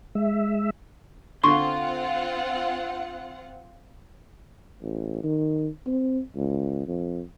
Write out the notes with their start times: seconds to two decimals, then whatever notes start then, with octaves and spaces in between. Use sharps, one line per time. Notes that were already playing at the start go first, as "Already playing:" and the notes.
0.15 G#3 E5
1.44 D3 C4 F4 F#5 C6 C#6
4.82 A1
5.24 D#3
5.86 C4
6.36 C#2
6.87 F2